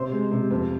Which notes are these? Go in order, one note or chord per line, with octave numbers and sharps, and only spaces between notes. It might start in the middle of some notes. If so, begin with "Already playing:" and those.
Already playing: C3 C5 C6
G#3
C3
F2